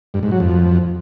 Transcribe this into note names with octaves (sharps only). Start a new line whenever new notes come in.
G2
G#2
F#3
F2